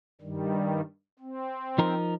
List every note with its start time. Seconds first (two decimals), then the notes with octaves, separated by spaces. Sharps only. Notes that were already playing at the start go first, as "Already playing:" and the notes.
0.21 G2 D#3 G3
1.19 C4
1.78 F3 D#4 A#4